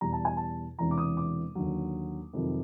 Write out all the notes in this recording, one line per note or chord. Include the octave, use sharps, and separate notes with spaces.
E2 B2 G3 A#5
A5
G#5
A5
E1 E2 C3 E3 A#5
D6
D#6
D6
D#2 D3 F#3
F2 C3 D#3 F#3